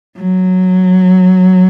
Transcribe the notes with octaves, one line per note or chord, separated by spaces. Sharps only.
F#3